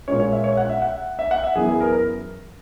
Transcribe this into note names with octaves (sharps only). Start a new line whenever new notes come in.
A#2 G#3 C#4 C#5
C#5
E5
C#5
F#5
E5
F#5
E5
F#5
E5
F#2 E3 B3 G#4
G#4
A#4
A#4